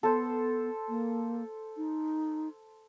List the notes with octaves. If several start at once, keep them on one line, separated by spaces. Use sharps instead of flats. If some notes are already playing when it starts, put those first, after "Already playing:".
B3 A4 C5
A#3
D#4